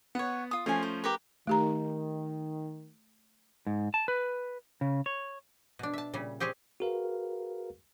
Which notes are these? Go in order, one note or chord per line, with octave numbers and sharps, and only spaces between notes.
B3 C#5 F#5
F4 D#6
F3 A3 C#4 G#5 C6
C5
G4 A#4 B4
D#3 A3 G4 A#5
G#2
A5
B4
C#3
C#5
B2 D4
E5 A5
A#2 C#3 G3
C4 G4 G#4 C5 C#5
F#4 G#4 A#4 B4 F5